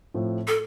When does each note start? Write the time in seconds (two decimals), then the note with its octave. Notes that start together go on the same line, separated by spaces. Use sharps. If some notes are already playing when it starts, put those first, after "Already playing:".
0.14 A2 F3 C4
0.48 A4